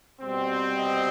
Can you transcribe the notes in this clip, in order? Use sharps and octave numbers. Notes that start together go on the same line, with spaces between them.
B2 G3 C4
D#5